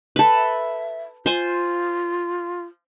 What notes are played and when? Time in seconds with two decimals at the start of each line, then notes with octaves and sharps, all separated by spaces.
0.16 A4 B4
0.34 E5
1.26 F4 C5 G#5